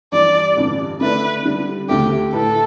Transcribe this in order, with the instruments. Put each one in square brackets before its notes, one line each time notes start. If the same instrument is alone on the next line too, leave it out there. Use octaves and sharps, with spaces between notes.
[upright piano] G2 E3 G3 D4 [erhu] D5
[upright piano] A1 G2 D3
[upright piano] D3 A3 E4 A4 D5 [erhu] B4
[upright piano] D3 G3 D4
[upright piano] D2 D3 A3 [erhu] G4
[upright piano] A2 A3 E4 B4 [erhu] A4